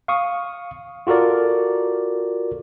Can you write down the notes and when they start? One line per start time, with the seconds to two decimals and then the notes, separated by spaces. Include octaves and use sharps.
0.08 F5 C#6 D#6
1.07 F4 F#4 A4 A#4 D5